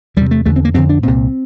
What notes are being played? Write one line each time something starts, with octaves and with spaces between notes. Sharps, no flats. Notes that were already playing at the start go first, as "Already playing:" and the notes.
E2 C3 G3
A3
E2 D3 A3
C4
A#3
F2 D3 C4
D4
C2 A#2 C4